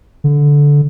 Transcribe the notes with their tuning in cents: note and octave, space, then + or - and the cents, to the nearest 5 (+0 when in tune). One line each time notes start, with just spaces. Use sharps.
D3 -15